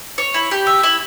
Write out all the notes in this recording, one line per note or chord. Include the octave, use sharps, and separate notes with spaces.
C#5
E4
G4
E5
E4